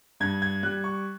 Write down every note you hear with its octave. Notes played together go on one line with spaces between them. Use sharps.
G2 G#6
G#6
G3 F#6
C#6